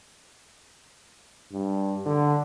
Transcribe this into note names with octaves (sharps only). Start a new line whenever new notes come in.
G2
D3